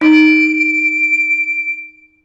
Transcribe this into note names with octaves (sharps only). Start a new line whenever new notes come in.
D#4 D7